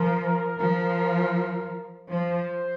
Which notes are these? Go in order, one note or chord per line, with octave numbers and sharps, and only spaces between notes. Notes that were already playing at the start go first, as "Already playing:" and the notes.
Already playing: F3 A#4
F3
F3 C5